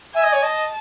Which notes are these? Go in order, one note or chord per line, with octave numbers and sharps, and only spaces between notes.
E5 G#5
D#5
C#5
D#5 A5